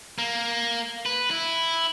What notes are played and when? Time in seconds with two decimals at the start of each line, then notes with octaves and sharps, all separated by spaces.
0.18 A#3
1.06 B4
1.31 E4